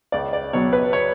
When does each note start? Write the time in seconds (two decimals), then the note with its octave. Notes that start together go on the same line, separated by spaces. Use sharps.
0.12 C#2 D5
0.33 D5
0.53 B2 F#3 C#5
0.73 B4
0.93 C#5